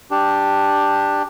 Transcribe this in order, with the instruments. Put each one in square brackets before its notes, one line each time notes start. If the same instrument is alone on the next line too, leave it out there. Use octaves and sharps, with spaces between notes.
[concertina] D4 G4